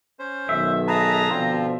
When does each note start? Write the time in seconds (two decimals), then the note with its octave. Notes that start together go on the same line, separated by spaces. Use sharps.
0.19 C#4 C5
0.49 B1 D#3 E5
0.87 G#4 B4 A5 A#5
1.29 B2 D3 F3 C4 F4